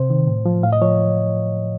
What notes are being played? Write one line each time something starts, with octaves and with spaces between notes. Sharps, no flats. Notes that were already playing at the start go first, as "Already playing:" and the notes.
Already playing: C3 C5
D#3
A2
F3
A2 F5
D#5
F3 C#5